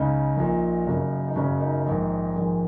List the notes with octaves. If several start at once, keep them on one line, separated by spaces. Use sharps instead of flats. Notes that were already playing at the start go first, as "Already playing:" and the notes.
Already playing: C#2 C#3 D#4
A#1 A#2
F#1 F#2 C#3
D#4
F#1 F#2 C#3 C#4
D#4
A#1 G#2 D#3
A#1 G#2 D#3 G#3